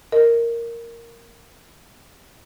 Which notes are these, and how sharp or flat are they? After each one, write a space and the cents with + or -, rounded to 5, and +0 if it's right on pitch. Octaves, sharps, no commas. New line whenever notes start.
A#4 -5 D#5 +0